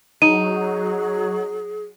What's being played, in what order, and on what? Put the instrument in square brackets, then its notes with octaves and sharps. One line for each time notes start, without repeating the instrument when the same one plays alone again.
[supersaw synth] F#3 [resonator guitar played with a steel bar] D#4 [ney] G#4 [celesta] D#7